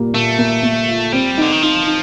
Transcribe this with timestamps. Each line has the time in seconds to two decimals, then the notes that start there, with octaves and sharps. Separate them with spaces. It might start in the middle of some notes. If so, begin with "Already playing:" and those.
Already playing: A#2 G3 A#3
0.14 A#2 A3
0.38 A#3
0.63 A#3
0.88 F4
1.12 G3 C4
1.38 D3 D#4
1.52 D#3
1.62 F3 D#4
1.86 D#4